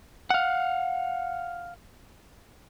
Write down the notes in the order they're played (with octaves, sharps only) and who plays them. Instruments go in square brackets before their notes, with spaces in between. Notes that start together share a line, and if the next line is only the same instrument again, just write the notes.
[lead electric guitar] F5 F#5